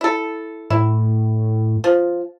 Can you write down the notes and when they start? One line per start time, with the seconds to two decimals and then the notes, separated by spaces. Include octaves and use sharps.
0.01 E4 A4
0.70 A2 E4
1.84 F3